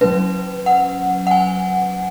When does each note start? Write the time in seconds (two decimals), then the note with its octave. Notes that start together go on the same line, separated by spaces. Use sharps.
0.01 F#3 C#4 B4
0.66 F#5
1.27 F#5
1.31 G#5